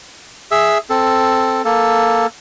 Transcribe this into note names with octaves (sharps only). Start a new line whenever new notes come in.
G#4 E5 E6
C4 A4
A#3 A4